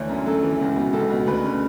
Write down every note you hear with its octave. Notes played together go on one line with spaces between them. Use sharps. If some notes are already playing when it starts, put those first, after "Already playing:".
Already playing: D2 E3 C#5
F#2
F#2 A4
E3
C#2
B2
C#2 A4
B2
D2 B4
C#3